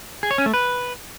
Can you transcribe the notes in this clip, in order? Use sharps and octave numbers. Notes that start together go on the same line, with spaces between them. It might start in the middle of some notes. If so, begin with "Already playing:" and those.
G#4
C#5
C#4
A3
B4